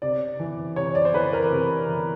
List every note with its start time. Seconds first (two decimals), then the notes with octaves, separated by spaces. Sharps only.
0.02 C3 D5
0.40 E3
0.76 C3 C#5
0.95 D5
1.05 C5
1.14 E3 B4
1.33 A#4
1.52 C3
1.89 E3